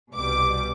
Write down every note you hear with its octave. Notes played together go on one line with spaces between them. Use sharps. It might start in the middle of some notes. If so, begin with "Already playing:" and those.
C2 B2 G3 D6